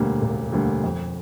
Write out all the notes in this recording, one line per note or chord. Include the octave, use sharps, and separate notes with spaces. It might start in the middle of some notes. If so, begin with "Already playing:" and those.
Already playing: E1 D2 D3 G3 A#3
E1
D2 D3 G3 A#3
F2